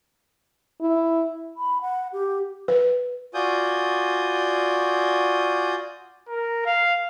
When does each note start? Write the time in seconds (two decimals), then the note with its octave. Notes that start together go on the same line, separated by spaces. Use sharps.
0.81 E4
1.57 B5
1.81 F#5
2.13 G4
2.68 B4
3.34 F4 F#4 D5 G#5 D#6 G6
6.28 A#4
6.66 F5